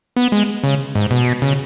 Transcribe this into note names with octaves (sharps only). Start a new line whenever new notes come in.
B3
G#3
C#3
G#2
B2
C#3